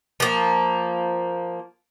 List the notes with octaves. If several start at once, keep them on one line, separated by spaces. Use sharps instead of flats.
F3 A#3